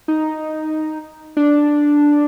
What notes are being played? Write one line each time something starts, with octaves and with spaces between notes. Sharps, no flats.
D#4
D4